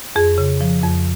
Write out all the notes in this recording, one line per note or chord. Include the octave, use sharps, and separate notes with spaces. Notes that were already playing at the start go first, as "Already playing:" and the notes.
F2 G#4
C#3
F3
F2